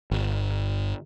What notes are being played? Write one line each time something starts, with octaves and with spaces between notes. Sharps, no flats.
G1